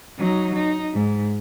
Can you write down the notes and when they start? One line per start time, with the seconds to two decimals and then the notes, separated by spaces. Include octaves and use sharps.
0.18 F#3 D#4
0.56 D#4
0.93 G#2